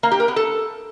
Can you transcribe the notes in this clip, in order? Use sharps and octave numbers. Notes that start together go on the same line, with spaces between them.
A#3
G4
A#4
B3
A4